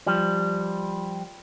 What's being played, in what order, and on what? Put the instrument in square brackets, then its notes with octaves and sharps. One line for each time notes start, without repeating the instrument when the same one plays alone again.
[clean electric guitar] F3 G3